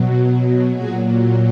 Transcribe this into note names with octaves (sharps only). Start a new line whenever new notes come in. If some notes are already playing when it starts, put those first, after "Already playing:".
Already playing: B2 F#3
A#2 F#3 F#4 G#4